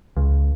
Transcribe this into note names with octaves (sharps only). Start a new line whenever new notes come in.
C#2